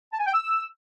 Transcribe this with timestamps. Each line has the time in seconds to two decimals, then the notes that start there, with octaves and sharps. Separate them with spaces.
0.13 A5
0.20 G#5
0.27 G5
0.34 E6